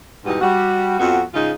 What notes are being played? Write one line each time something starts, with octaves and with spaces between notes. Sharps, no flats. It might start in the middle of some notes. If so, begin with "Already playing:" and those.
E2 G#2 B2 G3 B3 D#4
G3 F#4
F2 B3 F#4
G#2 C#3 G#3 D#4 F4